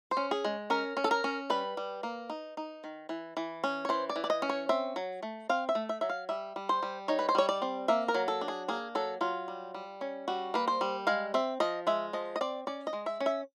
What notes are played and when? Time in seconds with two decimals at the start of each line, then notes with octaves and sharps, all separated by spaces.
0.11 C5
0.17 C#4
0.31 G#4
0.45 G#3
0.70 C#4 A#4
0.97 C#4
1.04 A4
1.11 A#4
1.24 C#4
1.50 G3 B4
1.77 G3
2.03 A#3
2.30 D#4
2.57 D#4
2.84 D#3
3.09 E3
3.37 E3
3.64 C#4
3.85 C#5
3.89 E3 C5
4.09 D5
4.16 E3
4.24 D5
4.30 D#5
4.42 C#4
4.49 C#5
4.69 C4 E5
4.96 F#3
5.23 A3
5.49 C4 F5
5.69 E5
5.75 A3
5.89 E5
6.01 F#3 E5
6.09 F5
6.29 G3 E5
6.56 G3
6.69 C5
6.83 G3
7.08 D#4 C#5
7.19 B4
7.29 C5
7.35 G3 C#5
7.49 D5
7.62 C4
7.88 A#3 E5
8.08 A#4
8.14 F#3
8.28 A4
8.41 D4
8.48 G#4
8.68 A#3 G#4
8.95 F#3 A4
9.21 F#3 F4
9.48 G3
9.74 G3
10.01 C#4
10.28 G3 F#4
10.54 A#3 B4
10.68 C5
10.81 G3
11.07 G#3 F5
11.34 C4 E5
11.60 F3 D#5
11.87 G#3 E5
12.13 F3 D#5
12.36 D#5
12.41 C4 D5
12.67 C#4 D5
12.87 D#5
12.93 G#3
13.06 E5
13.20 C#4
13.26 E5